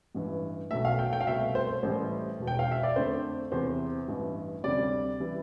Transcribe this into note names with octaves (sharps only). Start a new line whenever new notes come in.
A1 G2 E3
B1 B2 A3 E5
F5
G5
G5
F5
C2 B2 A3 E5
C5
C5
A1 A2 E3 G3 C5
E1 E2 B2
G5
F5
E5
D5
F2 D3 A3 C5
E2 C3 E3 C5
A1 G2 E3
D2 C3 G3 D5
E3 G3